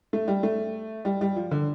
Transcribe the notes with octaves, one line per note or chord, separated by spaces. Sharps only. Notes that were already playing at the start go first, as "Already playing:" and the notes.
A3
G3
A3
G3
G3
F3
D3